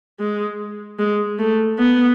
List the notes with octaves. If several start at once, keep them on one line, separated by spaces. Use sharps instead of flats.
G#3
G#3
A3
B3